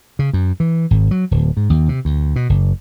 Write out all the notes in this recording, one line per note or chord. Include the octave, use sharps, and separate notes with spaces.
C#3
F#2
E3
G#1
F#3
D1
G#2
D#2
C3
D2
B2
F#1